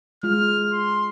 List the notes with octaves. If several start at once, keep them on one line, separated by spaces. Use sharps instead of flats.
G#3 F4 F6
C6